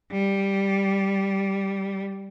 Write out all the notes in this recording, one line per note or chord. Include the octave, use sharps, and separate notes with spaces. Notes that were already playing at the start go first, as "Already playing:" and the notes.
G3